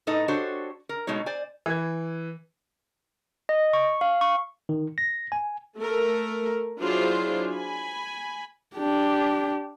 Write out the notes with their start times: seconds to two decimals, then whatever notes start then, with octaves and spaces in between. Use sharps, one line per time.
0.07 A2 D#4 A4 B4 D#5
0.28 D4 F#4 G4 A4 C5 C#5
0.89 A#4
1.07 B2 G#3 A3 D#4 C#5
1.26 C5 D5 G#5
1.66 E3 G#6
3.49 D#5
3.73 C#6
4.01 F5
4.21 C#6
4.69 D#3
4.98 A#6
5.32 G#5
5.78 A3 A4 A#4
6.80 F#3 D4 E4 F4 G#4 C5
7.49 G#5 B5
8.77 D4 G4